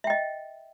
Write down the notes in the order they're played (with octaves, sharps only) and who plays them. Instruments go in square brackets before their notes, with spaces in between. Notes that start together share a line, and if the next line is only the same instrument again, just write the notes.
[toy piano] E5
G5
D#5